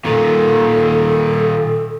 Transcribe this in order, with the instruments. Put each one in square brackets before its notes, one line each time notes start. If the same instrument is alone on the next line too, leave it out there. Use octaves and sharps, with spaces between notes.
[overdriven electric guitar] A#2 D#3 [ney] A4